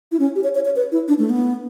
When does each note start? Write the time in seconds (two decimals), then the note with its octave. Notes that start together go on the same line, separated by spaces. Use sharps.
0.12 E4
0.19 C#4
0.36 G4
0.44 C#5
0.55 C#5
0.65 C#5
0.76 B4
0.92 E4
1.08 D4
1.19 A3
1.30 B3